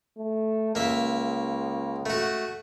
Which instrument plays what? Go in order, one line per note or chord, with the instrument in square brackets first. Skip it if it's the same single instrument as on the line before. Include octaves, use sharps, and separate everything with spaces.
[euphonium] A3
[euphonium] C#2 [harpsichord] A#3 E5
[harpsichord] A3 F#4